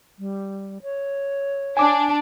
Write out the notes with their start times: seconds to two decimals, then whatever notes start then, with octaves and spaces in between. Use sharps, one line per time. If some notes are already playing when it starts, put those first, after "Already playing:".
0.19 G3
0.83 C#5
1.77 D4 G#5 D6